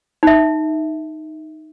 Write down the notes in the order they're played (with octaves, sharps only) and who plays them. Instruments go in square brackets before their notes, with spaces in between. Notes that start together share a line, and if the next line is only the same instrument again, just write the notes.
[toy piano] D#4 E5